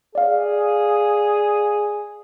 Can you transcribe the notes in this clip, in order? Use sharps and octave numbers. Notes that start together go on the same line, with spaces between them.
G#4 D5 F5